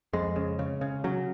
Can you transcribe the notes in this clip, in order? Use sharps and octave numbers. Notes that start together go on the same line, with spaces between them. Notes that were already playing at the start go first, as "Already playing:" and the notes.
F2 G#3
C#3
C#3
C#3
C#3 F#3